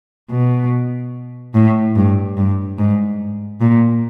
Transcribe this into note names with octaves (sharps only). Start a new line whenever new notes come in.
B2
A2
G2
G2
G#2
A#2